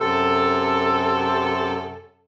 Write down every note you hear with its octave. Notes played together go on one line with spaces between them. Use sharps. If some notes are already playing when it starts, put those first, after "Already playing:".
F#2 C3 A4